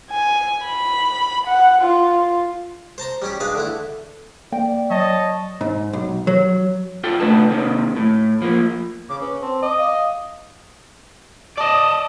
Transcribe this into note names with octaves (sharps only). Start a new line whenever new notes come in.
G#5
B5
F#5
F4
C5 A5 A#5 C6
G3 C#4 G4
G#3 D4 B4 F5
D3 A3 E4
A#3 D5 G5
F#3 C#5 D#5 A5
G#2
B1
F#3
F4 A4 G5
A2 C3 A3 D4 B4 A5
D#2 C3 D#3 C4
A2
F3 A#3
C#3 D6
C#4 B4
C4 A5
D#5 D6
F5
D5 D#5 A5